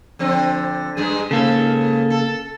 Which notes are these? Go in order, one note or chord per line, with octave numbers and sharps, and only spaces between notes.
D3 F3 C4
G2 G#3 G#4
G#2 C#3 A#3 A4
A4